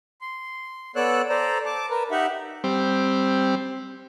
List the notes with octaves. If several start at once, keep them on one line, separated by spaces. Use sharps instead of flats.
C6
B3 A4 C#5 D5 E6 F#6
A4 C5 D5 A#5
A5 D6
A#4 B4
D#4 G4 E5 F#5
G3 C4